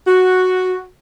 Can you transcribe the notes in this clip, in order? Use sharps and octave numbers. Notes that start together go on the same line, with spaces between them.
F#4